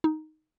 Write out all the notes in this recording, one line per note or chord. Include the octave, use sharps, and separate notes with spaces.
D#4